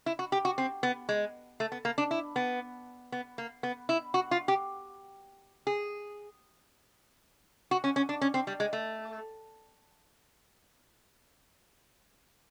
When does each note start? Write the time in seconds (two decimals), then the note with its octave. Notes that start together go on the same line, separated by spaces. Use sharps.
0.06 E4
0.19 F#4
0.32 G4
0.45 F#4
0.58 C4
0.83 B3
1.09 G#3
1.60 A3
1.72 B3
1.85 A#3
1.98 D4
2.11 E4
2.36 B3
3.12 B3
3.38 A#3
3.63 B3
3.89 E4
4.14 F#4
4.31 F4
4.48 G4
5.67 G#4
7.71 F#4
7.84 C#4
7.96 C#4
8.09 D4
8.21 C#4
8.34 C4
8.47 G3
8.60 G#3
8.73 A3